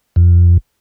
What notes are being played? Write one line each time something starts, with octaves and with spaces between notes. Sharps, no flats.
F2